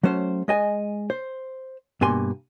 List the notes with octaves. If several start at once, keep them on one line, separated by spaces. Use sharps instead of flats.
F#3 A3 C#4 C5
G#3 D#5 G#5
C5
G2 B2 A#3 G#5 C6